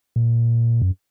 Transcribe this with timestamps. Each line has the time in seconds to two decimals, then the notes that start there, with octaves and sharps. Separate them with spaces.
0.16 A#2
0.82 F#2